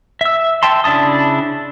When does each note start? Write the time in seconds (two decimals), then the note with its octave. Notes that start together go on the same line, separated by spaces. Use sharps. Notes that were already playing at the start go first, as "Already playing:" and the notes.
0.21 E5 E6
0.63 E5 G5 A5 C6
0.84 C#3 D4 E4 A5 D#6